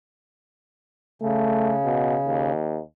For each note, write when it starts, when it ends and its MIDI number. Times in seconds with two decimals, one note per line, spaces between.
1.22 2.52 49
1.22 1.77 57
1.85 2.15 47
2.26 2.79 39